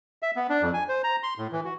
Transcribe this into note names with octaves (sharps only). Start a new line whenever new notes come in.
E5
B3
D4
F2
G#5
C5
A#5
C6
A2
E3
F#4